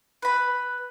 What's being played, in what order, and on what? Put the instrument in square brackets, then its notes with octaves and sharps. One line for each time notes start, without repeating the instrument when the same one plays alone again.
[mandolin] B4 B5